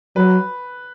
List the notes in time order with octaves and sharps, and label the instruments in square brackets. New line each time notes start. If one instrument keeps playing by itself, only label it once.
[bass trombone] F#3 [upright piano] B4